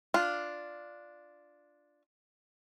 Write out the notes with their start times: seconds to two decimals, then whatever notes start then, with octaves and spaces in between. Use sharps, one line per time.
0.14 D4 F4